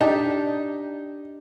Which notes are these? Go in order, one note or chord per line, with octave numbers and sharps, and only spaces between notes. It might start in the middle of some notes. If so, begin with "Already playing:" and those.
D4 D#4 G4 E5